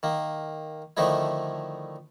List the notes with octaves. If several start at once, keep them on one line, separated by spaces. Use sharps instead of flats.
D#3 A#3
D3 D#3 F3 A3 D#4 E4